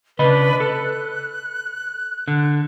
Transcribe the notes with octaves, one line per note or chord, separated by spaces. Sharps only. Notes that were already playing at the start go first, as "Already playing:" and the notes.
C#3 D4 B4 D#5 B5
A4 F#6
D3